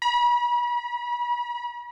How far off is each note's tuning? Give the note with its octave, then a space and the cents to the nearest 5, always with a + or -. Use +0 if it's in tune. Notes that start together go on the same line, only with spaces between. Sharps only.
B5 -40